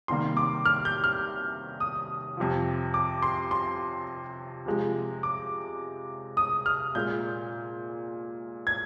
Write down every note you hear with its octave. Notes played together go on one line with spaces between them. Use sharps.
C3 D#3 G3 A#3 C6
D6
F6
G6
F6
D#6
F2 C3 F3
D6
C6
C6
C3 F3 G#3
D6
D#6
F6
A#2 G#3 G6
G#6